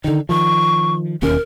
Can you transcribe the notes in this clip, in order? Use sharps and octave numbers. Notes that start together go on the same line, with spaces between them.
D3 D#3 D#4
D#3 F3 C#6
E1 D#2 C#4 A#4